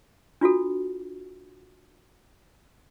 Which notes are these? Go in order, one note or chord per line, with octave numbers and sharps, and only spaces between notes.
D4 F4 F#4 A4